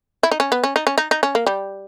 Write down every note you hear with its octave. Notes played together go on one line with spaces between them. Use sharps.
E4
D#4
C#4
B3
C#4
D#4
C#4
D#4
D#4
C#4
A#3
G3